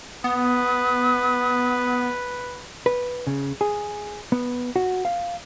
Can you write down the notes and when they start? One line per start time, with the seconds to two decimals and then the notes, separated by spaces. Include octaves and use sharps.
0.24 B3 B4 D#6
2.86 B4
3.27 C#3
3.61 G#4
4.32 B3
4.76 F#4
5.05 F5